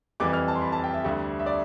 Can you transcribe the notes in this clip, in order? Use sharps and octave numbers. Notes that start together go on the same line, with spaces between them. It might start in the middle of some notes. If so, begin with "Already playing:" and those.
F2 E3 G3 D6
F6
A5
C6
B5
A5
G5
E5
D2 D3 G3
E5
D5